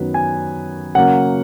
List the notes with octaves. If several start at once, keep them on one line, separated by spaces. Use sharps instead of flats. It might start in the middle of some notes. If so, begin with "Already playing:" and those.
Already playing: F#2 D#3 F#3 B3
G#5
C#3 F#3 A#3 F#5